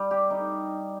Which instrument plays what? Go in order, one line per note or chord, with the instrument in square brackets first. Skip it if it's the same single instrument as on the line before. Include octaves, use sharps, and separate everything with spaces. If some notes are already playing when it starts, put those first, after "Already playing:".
Already playing: [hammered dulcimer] G3
G4
D#4